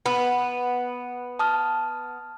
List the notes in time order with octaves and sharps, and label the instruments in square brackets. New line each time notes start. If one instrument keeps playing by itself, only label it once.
[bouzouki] B3
[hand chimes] A5 D#6 F6